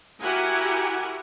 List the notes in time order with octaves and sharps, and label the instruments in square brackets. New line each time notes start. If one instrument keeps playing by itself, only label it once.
[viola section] E4 F#4 G4 A#4 F#5 G#5